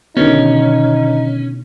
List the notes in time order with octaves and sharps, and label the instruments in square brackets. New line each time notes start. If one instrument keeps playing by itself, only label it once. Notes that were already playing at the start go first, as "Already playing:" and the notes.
[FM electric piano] B2 D3 D#3 [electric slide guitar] C#4 [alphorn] D#4